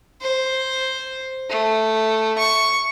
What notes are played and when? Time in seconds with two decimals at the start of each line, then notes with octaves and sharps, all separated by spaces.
0.22 C5
1.50 A3
2.38 C#6